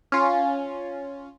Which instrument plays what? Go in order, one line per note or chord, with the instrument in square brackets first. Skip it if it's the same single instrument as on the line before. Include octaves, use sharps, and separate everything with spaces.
[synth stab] C#4 F4